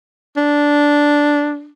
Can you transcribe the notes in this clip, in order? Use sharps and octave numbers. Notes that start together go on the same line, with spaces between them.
D4